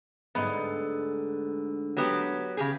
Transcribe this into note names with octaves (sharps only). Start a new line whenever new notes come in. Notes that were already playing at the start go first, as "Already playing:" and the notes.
D2 G#2 D3 B3 D#5
F#3 B3 G4
C#3 G4 G#4